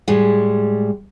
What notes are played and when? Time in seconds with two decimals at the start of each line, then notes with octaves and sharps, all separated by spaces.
0.08 A2 G3 G#3